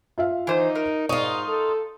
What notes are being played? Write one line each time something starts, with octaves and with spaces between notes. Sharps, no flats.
F4 E5 F5
E3 D#4 C5
A#4
G#2 D#4 F4 C#6
A4